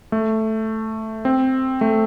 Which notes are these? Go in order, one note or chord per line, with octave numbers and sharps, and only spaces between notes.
A3
C4
A3